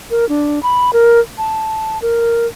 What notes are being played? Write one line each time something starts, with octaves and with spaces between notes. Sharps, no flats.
A#4
D4
B5
A#4
A5
A#4